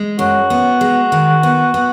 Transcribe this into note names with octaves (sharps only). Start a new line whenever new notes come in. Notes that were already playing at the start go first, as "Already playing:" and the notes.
Already playing: G#3
F#2 F#4
B3
G#3
D#3
B3
B3